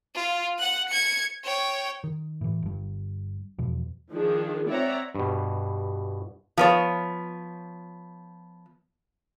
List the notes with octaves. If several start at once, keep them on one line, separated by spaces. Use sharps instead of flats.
F4
F#5 F#6
G#6 C#7
C#5 G5
D#3
A2 E3
G1 G2
E2 B2 F3
D#3 F3 D4 G#4
C4 C#5 D5 E5 F#5 A#5
G2 B2
F3 B3 C#5